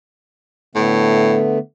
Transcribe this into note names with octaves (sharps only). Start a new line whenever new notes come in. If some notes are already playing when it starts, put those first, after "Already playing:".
A2 D3 A3 B3